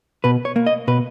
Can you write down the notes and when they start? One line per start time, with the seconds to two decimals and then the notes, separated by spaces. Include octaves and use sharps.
0.24 B2 B4
0.45 C#5
0.56 A#3
0.66 D#5
0.88 B2 B4